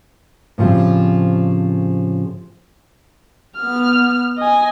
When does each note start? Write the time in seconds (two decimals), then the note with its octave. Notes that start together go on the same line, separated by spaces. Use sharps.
0.58 A2 C#3 F3 G3 C4
3.58 B3 F6
4.38 D#5 G#5